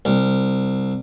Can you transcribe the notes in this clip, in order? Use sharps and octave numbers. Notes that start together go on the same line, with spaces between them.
C2